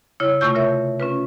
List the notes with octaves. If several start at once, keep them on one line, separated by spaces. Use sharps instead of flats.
C#3 E4 C#5
C3 A3 F4 C#6 E6 G6
F4 A#4 C#5 E5
C#4 F4 B4